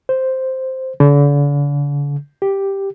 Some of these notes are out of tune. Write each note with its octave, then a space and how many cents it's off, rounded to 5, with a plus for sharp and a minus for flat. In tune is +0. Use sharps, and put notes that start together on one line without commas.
C5 +0
D3 -40
G4 +0